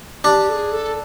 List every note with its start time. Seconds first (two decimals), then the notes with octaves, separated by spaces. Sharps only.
0.24 D4 G4
0.49 A4
0.53 G#4
0.72 A4